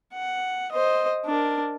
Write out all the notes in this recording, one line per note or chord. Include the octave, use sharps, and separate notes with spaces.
F#5
C5 D#5
D4 A#4